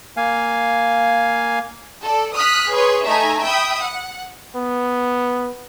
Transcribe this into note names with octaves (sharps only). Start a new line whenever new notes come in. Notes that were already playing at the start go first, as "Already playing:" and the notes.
A#3 F5 G#5
A4 D5
D#6 F6 F#6 B6
G#4 B4 C#5 C6
A3 D#4 E5 G#5 A#5
E5 G5 B5 D#6 E6
F#5
B3